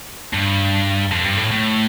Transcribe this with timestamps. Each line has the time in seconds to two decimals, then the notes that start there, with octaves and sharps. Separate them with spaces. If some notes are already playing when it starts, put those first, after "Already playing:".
0.34 G2
1.11 F2
1.24 G2
1.37 A2
1.51 A2